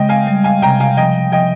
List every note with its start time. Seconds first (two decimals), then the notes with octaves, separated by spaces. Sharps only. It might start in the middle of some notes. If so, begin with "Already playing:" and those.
Already playing: C#3 G#3 D#5 G5
0.09 F5 G#5
0.27 G3
0.44 F5 G#5
0.62 C3 G5 A#5
0.80 F5 G#5
0.97 F3 D#5 G5
1.32 F3 D#5 G5